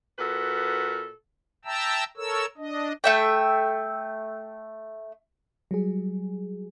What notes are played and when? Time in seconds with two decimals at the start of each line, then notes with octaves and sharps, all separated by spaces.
0.19 A#2 F#4 A4 B4
1.65 E5 G5 A5 A#5 E6
2.17 A4 A#4 C#5 E6
2.57 D4 D#5
3.04 A3 E5 G5
5.71 F#3 G3 G#4